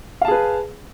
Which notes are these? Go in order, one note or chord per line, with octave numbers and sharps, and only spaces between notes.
G#4 B4 F5 A5